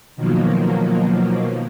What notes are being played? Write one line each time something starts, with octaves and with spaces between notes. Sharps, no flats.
B2 D#3 F3 F#3 A#3